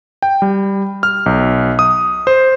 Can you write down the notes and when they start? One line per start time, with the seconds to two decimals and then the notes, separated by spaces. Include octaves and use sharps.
0.22 G5
0.42 G3
1.03 F6
1.26 B1
1.79 D#6
2.27 C5